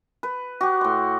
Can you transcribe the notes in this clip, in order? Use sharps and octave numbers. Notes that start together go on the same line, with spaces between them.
B4
F#4 G4
A2 C6